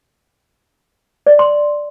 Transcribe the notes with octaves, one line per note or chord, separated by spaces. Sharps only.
D5
C6